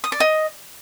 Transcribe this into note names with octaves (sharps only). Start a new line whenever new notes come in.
D#6
D5
D#5